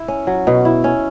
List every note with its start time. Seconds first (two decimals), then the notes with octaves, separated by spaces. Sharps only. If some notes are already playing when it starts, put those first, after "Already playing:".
Already playing: E4
0.08 C#4
0.27 F#3
0.47 B2
0.65 E4
0.84 C#4